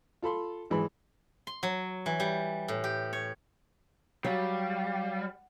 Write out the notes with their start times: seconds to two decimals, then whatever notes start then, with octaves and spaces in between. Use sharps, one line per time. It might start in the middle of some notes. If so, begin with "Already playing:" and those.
0.23 F4 A4 B5 C6
0.70 G#1 E3 G#3 B5
1.47 C6
1.63 F#3
2.06 E3
2.20 G3
2.68 A2
2.84 G4
3.13 C#5
4.24 F#3 G3 F5